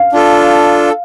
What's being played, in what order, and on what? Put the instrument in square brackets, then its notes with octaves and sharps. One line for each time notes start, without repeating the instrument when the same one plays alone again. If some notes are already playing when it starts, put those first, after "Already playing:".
Already playing: [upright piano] F5
[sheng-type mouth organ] D4 F4 A4